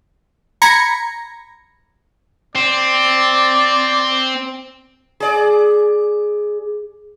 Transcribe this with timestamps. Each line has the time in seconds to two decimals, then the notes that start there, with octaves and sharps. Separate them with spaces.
0.62 A#5 B5 G#6 A#6 C#7
2.55 C4 D5
5.20 G#4 D5